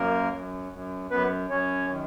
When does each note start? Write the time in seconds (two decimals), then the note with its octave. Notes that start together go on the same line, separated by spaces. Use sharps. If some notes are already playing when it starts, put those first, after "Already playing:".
Already playing: F#2 A#3 A#4
0.33 F#2
0.73 F#2
1.11 F#2 B3 B4
1.50 F#2 C#4 C#5
1.90 D#3